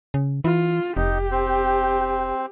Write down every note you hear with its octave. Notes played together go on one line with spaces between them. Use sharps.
C#3
E3 F4
F1 D#4 G4
C4